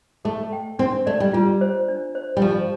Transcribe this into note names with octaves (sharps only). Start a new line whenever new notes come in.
A3 A4
G5
C4 D4
A3 D5
G3
G3 F4
C5
D4
C5
G3
F3 G4